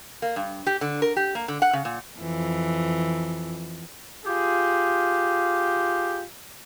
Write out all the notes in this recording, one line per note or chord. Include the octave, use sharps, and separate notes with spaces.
A#3
G2
G4
D3
A#4
G4
A#3
D3
F#5
C#3
A#2
F2 E3
F4 G4 G#4